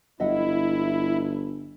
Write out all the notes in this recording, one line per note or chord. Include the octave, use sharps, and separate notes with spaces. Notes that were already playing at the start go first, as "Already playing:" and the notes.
G1 E4 D#5 E5 F#5